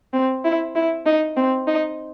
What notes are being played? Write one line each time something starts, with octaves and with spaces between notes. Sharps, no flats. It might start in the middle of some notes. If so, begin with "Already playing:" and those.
C4
E4
E4
D#4
C4
D#4